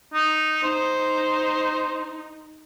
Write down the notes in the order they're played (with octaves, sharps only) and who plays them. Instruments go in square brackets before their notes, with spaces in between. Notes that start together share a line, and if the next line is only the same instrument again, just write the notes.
[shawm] D#4
[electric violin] D#4 [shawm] C5